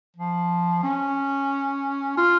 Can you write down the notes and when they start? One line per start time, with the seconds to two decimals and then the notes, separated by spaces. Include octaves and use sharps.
0.16 F3
0.83 C#4
2.17 F4